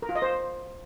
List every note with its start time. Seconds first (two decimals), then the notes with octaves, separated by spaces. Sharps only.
0.02 A#4
0.09 F4
0.16 D#5
0.22 C5